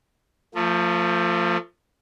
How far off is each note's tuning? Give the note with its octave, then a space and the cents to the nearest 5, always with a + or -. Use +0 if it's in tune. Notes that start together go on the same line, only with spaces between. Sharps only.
F3 +0 A3 +40